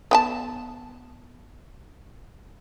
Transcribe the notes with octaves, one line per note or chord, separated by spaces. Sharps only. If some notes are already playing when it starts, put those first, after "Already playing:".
B3 G5 A5